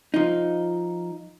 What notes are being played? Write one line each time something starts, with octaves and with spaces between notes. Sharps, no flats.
F3 D#4